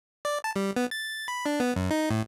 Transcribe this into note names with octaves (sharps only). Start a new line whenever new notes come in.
D5
A5
G3
B3
A6
B5
D4
B3
F#2
D#4
A2